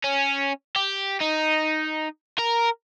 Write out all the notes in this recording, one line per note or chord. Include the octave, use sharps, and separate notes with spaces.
C#4
G4
D#4
A#4